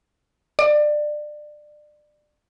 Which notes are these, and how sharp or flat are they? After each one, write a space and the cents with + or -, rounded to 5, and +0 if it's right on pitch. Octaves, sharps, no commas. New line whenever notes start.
D5 +25